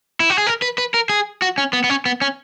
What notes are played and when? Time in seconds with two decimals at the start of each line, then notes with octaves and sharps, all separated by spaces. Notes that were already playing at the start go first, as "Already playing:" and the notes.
0.20 E4
0.30 F#4
0.38 G#4
0.47 A#4
0.62 B4
0.78 B4
0.94 A#4
1.09 G#4
1.42 F#4
1.58 C#4
1.73 B3
1.84 B3
1.90 C#4
2.06 B3
2.21 C#4